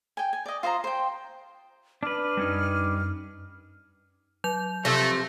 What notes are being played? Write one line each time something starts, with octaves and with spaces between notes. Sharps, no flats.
G5 G#5
G#5
D5 D#5
F4 C5 D#5 A#5
C5 G5
D4 B4 F6
F#2 G3 C#4 D#4
F#3 G6 F7
C3 F3 A3 A#6